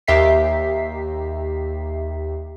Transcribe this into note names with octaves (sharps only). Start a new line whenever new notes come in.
D#2 G4 E5 A#5 B6 C7